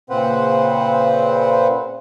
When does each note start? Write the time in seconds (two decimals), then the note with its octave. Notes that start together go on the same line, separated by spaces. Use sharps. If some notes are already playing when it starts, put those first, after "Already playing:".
0.10 A#2 C#3 C4 B4 C5 F#5